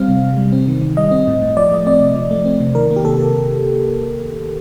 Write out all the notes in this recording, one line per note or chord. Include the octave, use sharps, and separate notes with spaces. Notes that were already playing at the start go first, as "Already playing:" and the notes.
Already playing: G3 C4 F5
C3
C3
G3
C4
D#3
D#3
G3 D#5
C4
A2
A2
F3 D5
A3 D#5
C4 D5
C3
F3
A3
C4
C3
D#3 A#4
A#3
G4
C3 A4
C3